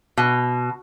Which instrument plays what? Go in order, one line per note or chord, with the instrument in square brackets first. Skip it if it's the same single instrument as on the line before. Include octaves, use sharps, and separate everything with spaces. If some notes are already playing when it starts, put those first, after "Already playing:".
[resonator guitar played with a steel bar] B2